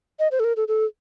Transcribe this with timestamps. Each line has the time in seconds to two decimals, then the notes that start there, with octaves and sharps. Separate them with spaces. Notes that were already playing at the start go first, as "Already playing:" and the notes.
0.19 D#5
0.31 C5
0.40 A4
0.44 A#4
0.57 A4
0.68 A4